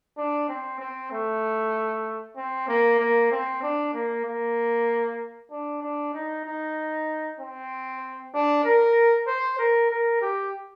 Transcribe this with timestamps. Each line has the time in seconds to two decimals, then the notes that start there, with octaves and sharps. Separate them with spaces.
0.18 D4
0.49 C4
0.80 C4
1.12 A3
2.36 C4
2.68 A#3
3.00 A#3
3.32 C4
3.62 D4
3.93 A#3
4.26 A#3
5.51 D4
5.82 D4
6.14 D#4
6.45 D#4
7.39 C4
8.34 D4
8.64 A#4
9.27 C5
9.59 A#4
9.90 A#4
10.21 G4